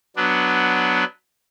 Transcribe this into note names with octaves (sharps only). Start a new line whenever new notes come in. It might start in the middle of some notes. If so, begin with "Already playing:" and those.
F#3 B3 D4